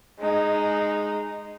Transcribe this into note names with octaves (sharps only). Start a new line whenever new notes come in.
G#3 D#4